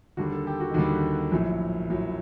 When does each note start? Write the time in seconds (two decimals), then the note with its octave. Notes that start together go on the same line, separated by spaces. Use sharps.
0.17 D#2 D3 G3 F#4
0.32 A4
0.47 G4
0.60 F#4
0.70 D#4
0.74 D#2 D3 G3 F#4
1.31 A#1 A2 F#3
1.89 A#1 A2 F#3